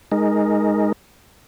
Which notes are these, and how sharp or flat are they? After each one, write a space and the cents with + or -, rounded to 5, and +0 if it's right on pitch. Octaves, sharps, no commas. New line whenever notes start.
G#3 +0 D#4 +0 A#4 +0